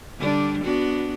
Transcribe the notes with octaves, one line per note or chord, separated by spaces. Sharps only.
D3 G3 D4
B3 D4 F#4